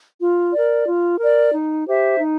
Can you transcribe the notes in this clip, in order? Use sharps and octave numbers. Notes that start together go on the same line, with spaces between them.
F4
A#4 D5
F4
A#4 D5
D#4
G4 C5 E5
D#4